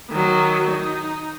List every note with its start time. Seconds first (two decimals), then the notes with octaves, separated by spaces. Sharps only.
0.10 D#3 F#3
0.71 D#4